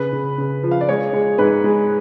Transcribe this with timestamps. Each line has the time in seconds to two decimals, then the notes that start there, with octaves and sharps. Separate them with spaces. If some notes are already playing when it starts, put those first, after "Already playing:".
Already playing: C#3 B4
0.13 C#3
0.38 C#3
0.63 F3
0.71 F5
0.81 D5
0.89 G#3 C#5
1.13 G#3
1.38 G#2 B4
1.64 G#3